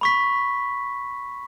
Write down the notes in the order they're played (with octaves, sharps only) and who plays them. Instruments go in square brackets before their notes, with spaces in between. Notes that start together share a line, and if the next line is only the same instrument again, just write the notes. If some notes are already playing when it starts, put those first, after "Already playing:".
[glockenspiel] B5 C#6 B6